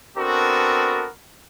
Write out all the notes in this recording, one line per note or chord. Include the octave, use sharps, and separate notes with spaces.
B3 C4 D4 F#4 A4 A#4